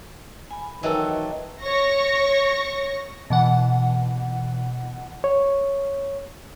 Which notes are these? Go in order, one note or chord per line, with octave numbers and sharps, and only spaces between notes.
G#5 B5
D#3 E3 F#3 A4 D#5 G5
C#5 C#6 A#6
B2 E3 F#5
C#5